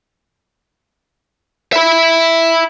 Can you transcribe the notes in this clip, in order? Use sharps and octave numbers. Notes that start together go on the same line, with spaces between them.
E5 B5